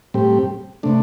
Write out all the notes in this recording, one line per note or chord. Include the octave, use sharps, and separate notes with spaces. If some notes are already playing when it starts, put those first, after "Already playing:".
A2 G3 C4 G4
C3 A3 D4